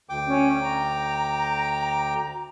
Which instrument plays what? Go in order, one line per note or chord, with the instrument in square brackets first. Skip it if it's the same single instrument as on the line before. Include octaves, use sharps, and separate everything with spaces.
[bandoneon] D2 G5 D6
[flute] C#4
A#5